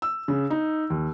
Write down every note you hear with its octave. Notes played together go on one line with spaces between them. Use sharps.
E6
C#3
D#4
D#2